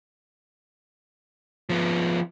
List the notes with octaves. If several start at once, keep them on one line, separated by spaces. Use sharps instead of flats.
F3 B3